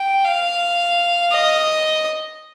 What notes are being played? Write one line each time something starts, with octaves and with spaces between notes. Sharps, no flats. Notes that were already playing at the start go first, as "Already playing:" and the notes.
Already playing: G5
F5
D#5